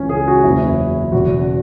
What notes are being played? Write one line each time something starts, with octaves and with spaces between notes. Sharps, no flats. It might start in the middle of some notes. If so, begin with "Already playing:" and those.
Already playing: C#2 C#3 E3 C#4
G#4
F#4
F#1 E2 E3 E4
E1 E2 C#3 F#4